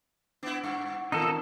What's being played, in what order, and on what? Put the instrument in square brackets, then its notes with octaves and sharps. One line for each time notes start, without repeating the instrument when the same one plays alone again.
[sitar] B3 E4 [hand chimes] D4 D6
[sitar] G2 [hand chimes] F#5 C#6 C#7
[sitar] D#2 [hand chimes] C4 F4 A#4 [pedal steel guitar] D#4 A4